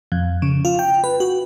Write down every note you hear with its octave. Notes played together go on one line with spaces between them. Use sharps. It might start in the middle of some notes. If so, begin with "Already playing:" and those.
F2
C#3
F4
G5
B4
F#4